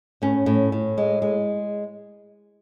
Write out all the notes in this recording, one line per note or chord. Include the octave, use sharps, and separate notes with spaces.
A2 C#4
A2
A2
G#3
G#3